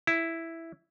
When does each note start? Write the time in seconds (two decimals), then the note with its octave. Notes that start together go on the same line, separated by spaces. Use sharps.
0.07 E4